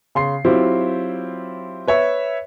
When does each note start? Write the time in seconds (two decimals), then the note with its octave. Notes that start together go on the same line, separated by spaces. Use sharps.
0.15 C#3 C6 C7
0.45 F#3 C4 E4 F4 G4 C5
1.88 B4 C#5 E5